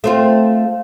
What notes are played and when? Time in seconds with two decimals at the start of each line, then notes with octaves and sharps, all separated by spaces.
0.04 A3 C4 F4